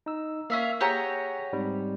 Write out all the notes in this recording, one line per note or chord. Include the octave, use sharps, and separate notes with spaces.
D#4 E6
A#3 C#4 E5 F5
G4 G#4 C#5 F#5 G#5 A#5
G#2 G3 C4